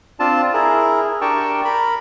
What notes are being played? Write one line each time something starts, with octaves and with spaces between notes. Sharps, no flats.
C4 D4 F4 A5
E4 G#4 A#4
D4 G4 A#4 G5 A5 C#6
A#4 B5